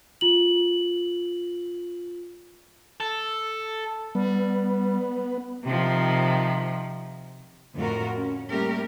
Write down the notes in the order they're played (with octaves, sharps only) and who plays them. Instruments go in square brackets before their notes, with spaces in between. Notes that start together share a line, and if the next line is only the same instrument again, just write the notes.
[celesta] F4 F#7
[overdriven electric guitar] A4
[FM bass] G3 [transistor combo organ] B3
[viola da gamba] C3 D#3 F3
[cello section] F2 A2 D3 F4 F#4 A#4
C#4
G3 A3 A#3 C#4 G4 A#4